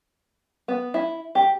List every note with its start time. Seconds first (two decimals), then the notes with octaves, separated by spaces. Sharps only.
0.68 B3
0.94 E4
1.35 G4